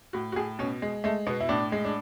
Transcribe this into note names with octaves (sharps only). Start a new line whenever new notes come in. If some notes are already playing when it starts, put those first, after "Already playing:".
A2 F#4
F#4
A2 G#4
B2 C#4
G#3
G#3 A3
B2 B3
E4
A2 D4
G#3
D4